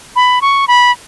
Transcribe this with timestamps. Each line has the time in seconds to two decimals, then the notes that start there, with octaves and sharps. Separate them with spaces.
0.16 B5
0.42 C#6
0.68 B5